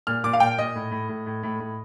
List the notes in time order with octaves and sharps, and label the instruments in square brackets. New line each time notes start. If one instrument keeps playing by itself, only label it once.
[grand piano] A#2 F6
A#2 D6
F5
A#2 G5
A#2 D#5
A2
A2
A2
A2
A2
A2